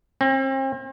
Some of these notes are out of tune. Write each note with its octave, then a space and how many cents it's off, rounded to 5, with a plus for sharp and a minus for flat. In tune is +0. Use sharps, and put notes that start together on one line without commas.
C4 +40